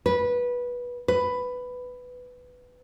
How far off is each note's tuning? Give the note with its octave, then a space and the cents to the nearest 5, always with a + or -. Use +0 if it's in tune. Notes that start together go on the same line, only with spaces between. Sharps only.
B4 -15
B4 +10